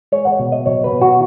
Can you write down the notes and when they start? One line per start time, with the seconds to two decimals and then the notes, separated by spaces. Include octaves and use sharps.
0.12 G#3 C#5
0.25 F#5
0.39 B2
0.52 D#5
0.65 F#3 C#5
0.84 B4
0.93 B2
1.01 F#4